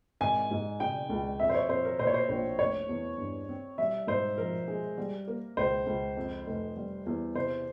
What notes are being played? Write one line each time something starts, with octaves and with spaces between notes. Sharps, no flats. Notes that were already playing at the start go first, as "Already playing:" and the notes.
G#1 G#5
G#2
C#3 G5
C#2
F2 E5
C5
C#5
F2 C5
A#4
A#2 C5
C#5
C5
A#1 C5
F1 C#5
E2
G2
C4
G3 E5
G#2 C5
F3 A#4
G#3
G3
A#3
C#2 C5
C#2
F2
F1
G3
E2
C3 C5